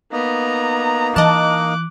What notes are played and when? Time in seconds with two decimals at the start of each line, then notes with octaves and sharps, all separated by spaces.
0.12 A#3 B3 D#4 A#5
1.16 E3 D#5 A5 D6 F#6